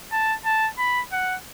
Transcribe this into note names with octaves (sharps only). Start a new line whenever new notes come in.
A5
A5
B5
F#5